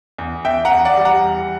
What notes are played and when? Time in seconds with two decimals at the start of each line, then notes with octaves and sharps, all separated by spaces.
0.18 E2
0.45 E2 E5 G5
0.65 F#5 A#5
0.71 E2
0.85 D5 F#5
0.97 G3
1.05 F#5 A#5
1.25 E2